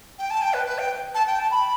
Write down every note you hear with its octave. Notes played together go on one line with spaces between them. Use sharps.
G5
A5
G5
B4
B4
G5
A5
G5
A5
B5